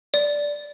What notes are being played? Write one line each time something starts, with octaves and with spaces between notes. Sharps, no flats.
D5